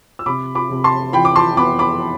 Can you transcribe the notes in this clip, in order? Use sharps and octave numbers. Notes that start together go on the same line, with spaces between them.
E6
C3 B5 D6
B5 D6
C3
A5 C6
E3 G5 B5
D6
A5 C6
B3 B5 D6
B5 D6